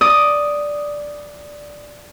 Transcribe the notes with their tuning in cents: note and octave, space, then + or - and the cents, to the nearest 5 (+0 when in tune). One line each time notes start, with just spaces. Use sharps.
D5 +0 D#6 +0